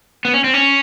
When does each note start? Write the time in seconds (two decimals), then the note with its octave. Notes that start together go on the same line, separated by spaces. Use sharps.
0.25 B3
0.34 C#4
0.44 C4
0.54 C#4